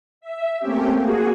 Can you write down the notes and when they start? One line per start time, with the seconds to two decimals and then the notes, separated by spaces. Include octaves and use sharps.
0.21 E5
0.60 A3 A#3 C4 C#4 G4
0.97 A#3 F#4 G#4